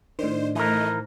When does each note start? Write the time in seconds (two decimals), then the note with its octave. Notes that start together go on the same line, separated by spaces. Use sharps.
0.19 A2 D#3 D4 C5 D5 D#5
0.55 E3 A3 A#4 C5 D#5